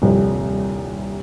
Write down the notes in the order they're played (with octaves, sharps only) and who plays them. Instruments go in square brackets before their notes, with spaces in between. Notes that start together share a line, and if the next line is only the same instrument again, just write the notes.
[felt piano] D#1 C2 G2 C3 F3